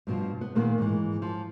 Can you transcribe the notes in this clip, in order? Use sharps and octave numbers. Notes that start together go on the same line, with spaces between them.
G2 B2 F3
B3
A#2 D#3 A#3 B3
G#2 E3
F3